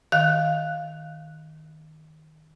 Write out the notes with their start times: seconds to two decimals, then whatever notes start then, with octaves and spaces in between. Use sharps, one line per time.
0.12 D#3 F5 F#6